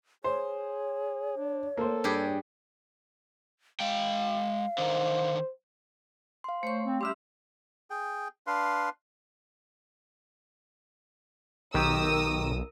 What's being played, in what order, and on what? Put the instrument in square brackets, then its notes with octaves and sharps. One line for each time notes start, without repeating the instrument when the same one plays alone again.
[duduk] G#4 [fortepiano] C5 [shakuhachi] C#5
[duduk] D4
[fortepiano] A#3 C5 [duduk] A4
[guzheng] G2 G4 G#4
[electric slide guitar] G#3 G5 [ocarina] F5
[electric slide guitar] D3 D#3 [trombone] C5
[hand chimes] F5 C6
[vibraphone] A3 C#5 C#6 [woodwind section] C5
[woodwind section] C4
[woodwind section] G3 G4 [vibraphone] C#4 E5 [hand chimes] C6 E6 F6
[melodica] G#4 G5
D4 B4 F5 C6
[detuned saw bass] B1 [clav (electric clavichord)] D#3 G4 [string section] A#4 D#6 E6